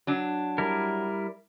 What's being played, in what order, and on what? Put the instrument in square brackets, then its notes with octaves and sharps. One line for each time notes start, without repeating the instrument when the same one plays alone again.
[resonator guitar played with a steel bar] F#3 D4
[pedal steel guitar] G3 E4 A#4